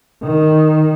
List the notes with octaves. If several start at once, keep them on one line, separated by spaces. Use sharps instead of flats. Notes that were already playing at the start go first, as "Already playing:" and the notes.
D#3